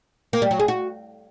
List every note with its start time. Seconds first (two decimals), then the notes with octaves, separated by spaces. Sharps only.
0.33 A#3
0.42 G3
0.51 F#3
0.59 G#4
0.68 F#4